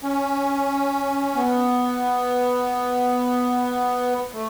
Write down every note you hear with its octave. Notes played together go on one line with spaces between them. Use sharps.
C#4
B3
A3